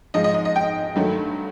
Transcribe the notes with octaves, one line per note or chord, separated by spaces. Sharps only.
G#2 F3 G#3 D#5
D#5
D#5
D#5
G5
G2 D#3 F#3 A3